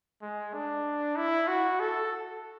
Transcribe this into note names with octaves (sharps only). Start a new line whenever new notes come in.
G#3
D4
E4
F#4
A4